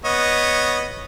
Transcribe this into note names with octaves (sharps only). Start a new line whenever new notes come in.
B3 C#5 D#5